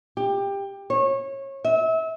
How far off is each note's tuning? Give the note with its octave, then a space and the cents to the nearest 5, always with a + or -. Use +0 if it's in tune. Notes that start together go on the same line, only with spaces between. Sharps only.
G4 +20
C#5 -25
E5 -30